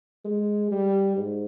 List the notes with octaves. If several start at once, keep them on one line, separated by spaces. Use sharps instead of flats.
G#3
G3
G#2